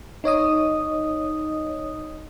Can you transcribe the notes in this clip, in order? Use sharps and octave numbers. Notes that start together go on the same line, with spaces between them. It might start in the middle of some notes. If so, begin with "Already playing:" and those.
D#4 C#5 D#5 D#6